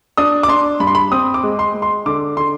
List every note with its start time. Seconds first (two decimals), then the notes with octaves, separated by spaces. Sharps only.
0.17 D4 D#6
0.43 D6
0.48 D4 C6
0.80 G2 B5
0.87 C6
0.95 B5
1.12 C4 D#6
1.34 D6
1.43 G#3
1.59 C6
1.74 G#3
1.82 C6
2.06 D3 D6
2.37 D3 C6